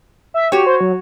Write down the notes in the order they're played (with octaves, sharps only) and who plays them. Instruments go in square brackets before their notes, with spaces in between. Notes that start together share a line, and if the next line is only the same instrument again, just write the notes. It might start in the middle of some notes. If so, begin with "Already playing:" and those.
[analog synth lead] E5
[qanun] F#4 C#5 [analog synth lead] G4
[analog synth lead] C5
F#3